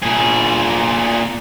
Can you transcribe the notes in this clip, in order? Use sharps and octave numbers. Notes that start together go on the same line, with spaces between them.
A#2 G#4